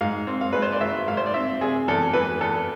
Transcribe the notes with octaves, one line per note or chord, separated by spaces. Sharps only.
G#2 F5
C4
F5
G#3 B4
C5
D5
G#1 E5
G#2 F5
C5
D5
C4 E5
C3 G#4
E2 A4
E3 B4
E2 A4